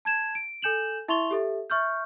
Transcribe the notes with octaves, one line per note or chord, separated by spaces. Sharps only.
A5 G#6 E7
D7
A4 G#5 G6 E7 F#7
E4 E5 C6 C#6 F7 G7
G4 A4 E5
E5 C#6 F6 G6